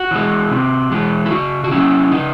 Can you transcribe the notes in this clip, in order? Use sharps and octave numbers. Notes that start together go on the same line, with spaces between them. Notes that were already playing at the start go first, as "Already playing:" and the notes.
Already playing: F#4
E3 G#3
C3
E3 G#3
E4
C#3 F#4
F#4
F#3 C#4 E4
C#3 D#4